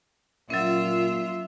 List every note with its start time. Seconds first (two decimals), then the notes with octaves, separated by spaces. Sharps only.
0.50 A#2 F#3 C#4 F4 E5